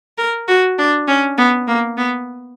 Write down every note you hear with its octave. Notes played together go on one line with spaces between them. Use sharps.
A#4
F#4
D4
C#4
B3
A#3
B3